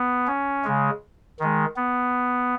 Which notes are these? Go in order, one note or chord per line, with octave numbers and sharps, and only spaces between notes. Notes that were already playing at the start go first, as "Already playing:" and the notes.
Already playing: B3
C#4
C#3 G#3
D#3 G#3
B3